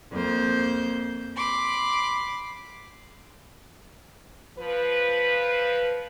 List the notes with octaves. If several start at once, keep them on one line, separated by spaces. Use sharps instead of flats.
F2 A#3 C5 G6
B5 C6 D6
F3 B4